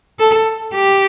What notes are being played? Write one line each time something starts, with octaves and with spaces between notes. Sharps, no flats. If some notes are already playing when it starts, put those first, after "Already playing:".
A4
G4